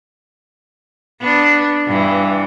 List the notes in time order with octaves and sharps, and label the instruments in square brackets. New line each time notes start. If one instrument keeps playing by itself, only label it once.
[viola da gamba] B3 D4
G2 E3